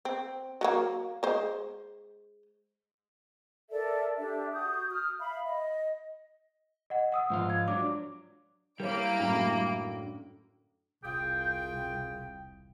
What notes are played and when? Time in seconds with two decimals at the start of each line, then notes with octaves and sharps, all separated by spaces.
0.05 C4
0.61 F#3 A3 A#3
1.23 G#3 C5
3.71 A4 A#4 D5 E5
4.17 D4 G4 A4 E5
4.53 F#4 D#6 G6
4.91 D#6 F6
5.20 E5 F5 B5
5.45 D#5
6.90 D#5 F#5
7.12 F#5 D#6 E6
7.30 G#2 F3 F4
7.50 G#6
7.68 F#3 D4 D6
8.80 G3 A#3 E4 A#4 C5 C#5 D7
9.18 F#2 A2 D3
11.04 E1 C2 F4 G#4 G5